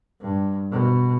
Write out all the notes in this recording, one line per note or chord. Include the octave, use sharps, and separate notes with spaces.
G2
B2